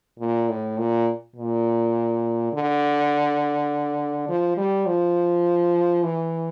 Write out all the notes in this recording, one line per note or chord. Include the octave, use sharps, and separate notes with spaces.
A#2
A2
A#2
A#2
D3
F3
G3
F3
E3